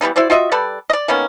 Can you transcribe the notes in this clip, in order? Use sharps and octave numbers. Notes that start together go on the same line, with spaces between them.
E3 G3 B3 D#4
E4 F#4 C5 D5
F4 F#4 D#5 E5
G3 A4 B4 D5
D5 D#5
D#3 A#3 B3 C#4